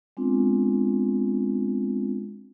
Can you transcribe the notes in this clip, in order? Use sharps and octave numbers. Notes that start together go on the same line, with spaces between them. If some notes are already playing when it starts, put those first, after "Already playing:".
G#3 B3 C4 D4 F4